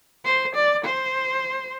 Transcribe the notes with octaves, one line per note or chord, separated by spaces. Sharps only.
C5
D5
C5